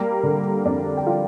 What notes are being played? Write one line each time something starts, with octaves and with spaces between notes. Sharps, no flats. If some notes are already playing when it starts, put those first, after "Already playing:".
Already playing: G3 A#3 A#4
D3
F2 D4 D5
G5
F4 F5